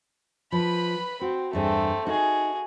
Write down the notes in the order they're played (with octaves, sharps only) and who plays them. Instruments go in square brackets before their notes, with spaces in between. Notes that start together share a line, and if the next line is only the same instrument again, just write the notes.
[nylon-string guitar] F3 [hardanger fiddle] B4 B5
[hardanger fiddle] C4 [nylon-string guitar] F#4
[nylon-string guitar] E2 G2 G#4 [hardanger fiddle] A3 C4
[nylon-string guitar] D#4 [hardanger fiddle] F#4 G#4